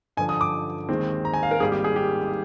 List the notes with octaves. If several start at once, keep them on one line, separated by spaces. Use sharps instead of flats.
G2 D3 F3 G#5
D#6
D6
D#2 D#3 G#3 C4
A#5
G#5
F5
A#4
G#1 G#2 G3 A#3 G#4
G4
G#4
G4